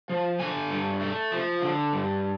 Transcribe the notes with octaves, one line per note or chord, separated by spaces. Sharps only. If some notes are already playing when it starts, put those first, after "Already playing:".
F3
D3 G#5
G2
A3
F3
D3
G2